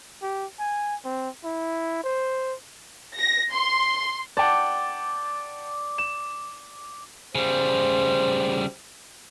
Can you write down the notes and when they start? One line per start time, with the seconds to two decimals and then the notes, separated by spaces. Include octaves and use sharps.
0.22 G4
0.59 G#5
1.05 C4
1.45 E4
2.04 C5
3.18 A#6
3.53 C6
4.37 D5 F#5 G5 A5
5.98 E7
7.35 C#3 G3 C5